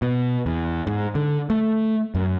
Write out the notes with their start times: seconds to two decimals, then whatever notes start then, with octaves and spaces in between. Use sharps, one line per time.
0.02 B2
0.46 E2
0.87 G#2
1.15 D3
1.50 A3
2.15 F#2